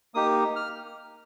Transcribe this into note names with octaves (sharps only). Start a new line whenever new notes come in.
A#3 D#4 G4 D#6
F6